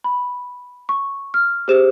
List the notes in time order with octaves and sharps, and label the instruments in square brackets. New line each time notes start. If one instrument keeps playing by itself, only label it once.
[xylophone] B5
C#6
F6
G4 G#4 C5 E7